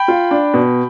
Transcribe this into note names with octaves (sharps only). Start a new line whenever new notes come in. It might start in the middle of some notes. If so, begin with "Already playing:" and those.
Already playing: G5 B5
F4
D4
B2